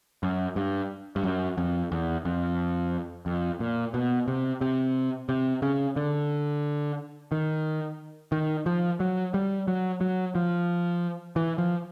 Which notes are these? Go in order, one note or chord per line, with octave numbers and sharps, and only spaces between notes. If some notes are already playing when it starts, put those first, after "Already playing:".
F#2
G2
G2
F#2
F2
E2
F2
F2
A#2
B2
C3
C3
C3
C#3
D3
D#3
D#3
F3
F#3
G3
F#3
F#3
F3
E3
F3